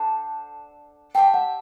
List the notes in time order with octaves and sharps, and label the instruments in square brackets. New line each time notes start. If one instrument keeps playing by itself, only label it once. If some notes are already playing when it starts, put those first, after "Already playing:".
Already playing: [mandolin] D4 A4 C5 F#5
[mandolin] G4 C5 E5 A5 [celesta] G5
[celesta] F#5